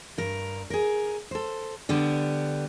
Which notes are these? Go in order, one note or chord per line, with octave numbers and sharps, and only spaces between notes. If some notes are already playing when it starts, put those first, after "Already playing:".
G2 A#4
G#4 A#4
A4 C5
D3 G3 B3